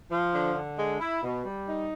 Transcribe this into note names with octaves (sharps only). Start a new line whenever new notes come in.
F3
D3
D3
G#3
E4
B2
G3
D#4